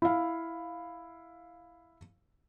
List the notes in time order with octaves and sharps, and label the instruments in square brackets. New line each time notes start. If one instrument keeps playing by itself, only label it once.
[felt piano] E4 F5